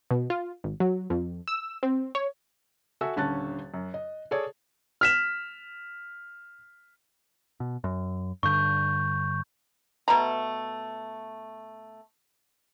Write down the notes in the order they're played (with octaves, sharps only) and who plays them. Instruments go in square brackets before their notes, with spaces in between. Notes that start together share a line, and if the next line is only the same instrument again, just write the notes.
[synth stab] B2
F4
G#1
F#3
F2
E6
C4
C#5
[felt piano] F#4 A4 E5 G#5 E6
D#1 D3 C#4 A5 F#6 A6
F#2
D#5
G#4 A4 C#5 D5
[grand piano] F6 B6 E7
[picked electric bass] B2
F#2
[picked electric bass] G2 D3 [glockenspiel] C#6 G6
[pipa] B2 A3 A#5